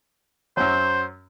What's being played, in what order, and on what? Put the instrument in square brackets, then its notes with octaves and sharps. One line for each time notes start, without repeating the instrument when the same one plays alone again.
[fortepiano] F#2 F#3 [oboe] C5